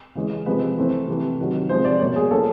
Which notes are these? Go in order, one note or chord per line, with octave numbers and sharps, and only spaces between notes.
C#3 E3 G#3 C#4
C3 F3 G#3 B4
E3 A3 C4
C3 E3 A3
C3 D#3 F#3
C3 F3 G#3 C4 C5
D5
B2 G3 A#3 C#5
G#4
F3 A#3 C#4 A4